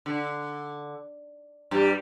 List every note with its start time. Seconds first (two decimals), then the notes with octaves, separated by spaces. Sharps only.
0.06 D3
1.71 G2 G3